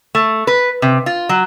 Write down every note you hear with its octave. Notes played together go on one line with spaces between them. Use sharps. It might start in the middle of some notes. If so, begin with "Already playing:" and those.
A3
B4
C3
F4
F#3